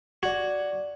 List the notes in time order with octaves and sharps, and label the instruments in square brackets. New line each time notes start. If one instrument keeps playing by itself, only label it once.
[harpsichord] F#4 [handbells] D5 G#6